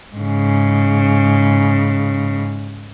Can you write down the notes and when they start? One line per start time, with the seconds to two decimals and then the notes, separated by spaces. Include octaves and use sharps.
0.15 G#2 C#3